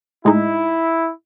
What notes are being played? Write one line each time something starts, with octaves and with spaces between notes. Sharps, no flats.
A2 G#3 D#4 E4